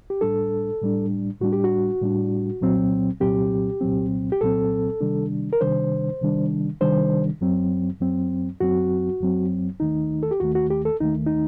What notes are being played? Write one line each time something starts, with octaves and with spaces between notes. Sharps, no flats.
G4
A2 G3 D4 A4
A2 G3 D4
A2 G3 D4 F#4
G4
F#4
A2 G3 D4
C2 A#2 F#3 C4
C2 A#2 F#3 C4 G4
C2 A#2 F#3 C4
G4
C2 A#2 F#3 C4 A4
C3 D#3 G3 D4
A#4
C3 D#3 G3 D4 C5
C3 D#3 G3 D4
C3 D#3 G3 D4 C5
F#2 F#3 C4
F#2 F#3 C4
F#2 F#3 C4 F#4
F#2 F#3 C4
D#2 D#3 A3 D#4
A4
G4
D#2 D#3 A3 F#4
F#4
G4
A4
D#2 D#3 A3 D#4
D#4